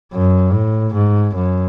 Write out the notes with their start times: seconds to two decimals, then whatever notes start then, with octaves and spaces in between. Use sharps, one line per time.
0.13 F#2
0.53 A2
0.94 G#2
1.35 F#2